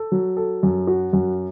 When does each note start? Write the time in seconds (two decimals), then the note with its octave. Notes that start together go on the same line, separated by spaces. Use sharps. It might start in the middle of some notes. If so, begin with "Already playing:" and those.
Already playing: A4
0.12 F#3
0.37 A4
0.63 F#2
0.87 F#4
1.13 F#2